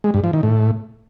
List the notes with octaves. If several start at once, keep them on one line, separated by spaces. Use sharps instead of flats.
G#3
G2
F3
D#3
A2